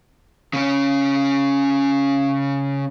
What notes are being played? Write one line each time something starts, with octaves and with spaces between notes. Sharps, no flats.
C#3 C#4